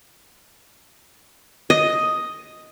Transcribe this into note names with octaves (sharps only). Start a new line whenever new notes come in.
D#5